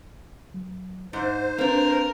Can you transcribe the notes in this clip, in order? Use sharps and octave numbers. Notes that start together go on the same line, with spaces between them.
F#3
G#2 D#4 C5
A#3 C4 D4 A#4 B4 F5